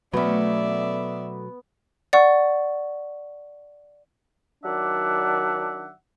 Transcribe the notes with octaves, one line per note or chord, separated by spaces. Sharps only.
B2 F#3 A3 B3 C#4 D5 E5
D5 F#5 C#6
D#3 F#3 D4 D5 E5 F#5